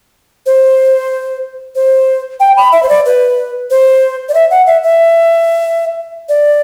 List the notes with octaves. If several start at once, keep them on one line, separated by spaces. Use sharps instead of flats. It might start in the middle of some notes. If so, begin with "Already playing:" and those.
C5
C5
G5
B5
E5
C5
D5
B4
C5
D5
E5
F#5
E5
E5
D5